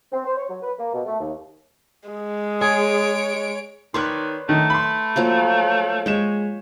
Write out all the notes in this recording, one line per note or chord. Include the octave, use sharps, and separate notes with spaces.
C4
C5
C#5
F#3
B4
A#3
B2
A3
D#2
G#3
G#4 C#5 D7
D#3 B4 C#5 D5 C6 F#6
D#3 A3
B5 C6
F3 F#3 A#3
G#3 C#5 G5 E7